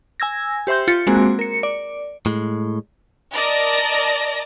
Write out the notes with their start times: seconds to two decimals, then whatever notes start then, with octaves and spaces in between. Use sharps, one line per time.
0.20 G#5 E6 G#6 A#6
0.67 G4 C5 E5 C6 G6
0.88 F4 A6 C#7
1.07 G#3 A#3 C4 F#4 G#4
1.39 A#4 C#7
1.63 D5
2.26 A2 G#3
3.34 A#4 D5 D#5 A5 A#6